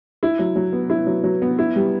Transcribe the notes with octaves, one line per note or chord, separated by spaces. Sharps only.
E4
F#3
F#3
B3
E4
F#3
F#3
B3
E4
G3